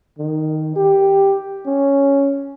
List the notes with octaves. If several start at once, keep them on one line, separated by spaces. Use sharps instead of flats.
D#3
G4
C#4